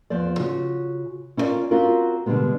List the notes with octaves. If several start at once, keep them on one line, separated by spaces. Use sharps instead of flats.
E2 F3 C5 D5
C#3 F4 F#4
C#4 E4 F4 A4 A#4 D5
C4 C#4 F4 F#4 A#4
B2 D3 G3 G#3 B3